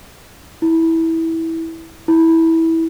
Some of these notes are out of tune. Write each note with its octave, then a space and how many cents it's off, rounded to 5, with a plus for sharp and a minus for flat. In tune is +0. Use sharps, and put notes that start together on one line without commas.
E4 -15
E4 -15